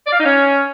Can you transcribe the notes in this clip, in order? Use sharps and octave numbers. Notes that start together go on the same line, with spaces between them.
D5
F5
D#4
C#4